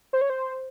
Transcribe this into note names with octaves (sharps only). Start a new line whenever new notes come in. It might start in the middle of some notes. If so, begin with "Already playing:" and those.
C5
C#5
C5